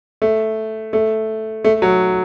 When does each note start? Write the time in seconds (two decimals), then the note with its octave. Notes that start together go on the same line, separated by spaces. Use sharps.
0.22 A3
0.93 A3
1.64 A3
1.82 F#3